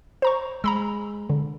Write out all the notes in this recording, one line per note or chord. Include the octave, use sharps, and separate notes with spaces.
C5 A#5 C#6
G#3 A#5 B5 E6
D3